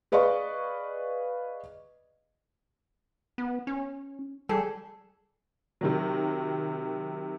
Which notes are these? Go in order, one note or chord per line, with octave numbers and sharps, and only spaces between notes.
G#4 B4 D5 D#5 F5 C#6
B3
C#4
G3 G#4 A4
C3 D#3 F#3